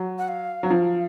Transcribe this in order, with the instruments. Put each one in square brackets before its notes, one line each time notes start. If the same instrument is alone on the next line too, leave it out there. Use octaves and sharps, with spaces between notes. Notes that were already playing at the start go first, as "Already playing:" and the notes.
Already playing: [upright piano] F#3
[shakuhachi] F#5
F5
[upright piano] F#3
[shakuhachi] F#5
[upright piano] F3 [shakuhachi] F5